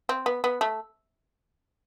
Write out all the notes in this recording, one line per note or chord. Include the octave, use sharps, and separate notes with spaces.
C4
B3
B3
A3